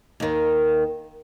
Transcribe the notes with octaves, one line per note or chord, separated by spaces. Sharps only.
D#2 D#3